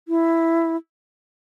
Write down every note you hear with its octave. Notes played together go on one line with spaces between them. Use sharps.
E4